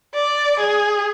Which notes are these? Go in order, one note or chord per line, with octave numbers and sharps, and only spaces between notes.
D5
G#4